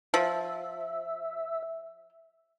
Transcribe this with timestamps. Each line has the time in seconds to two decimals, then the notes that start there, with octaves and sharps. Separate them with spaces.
0.14 F3 E5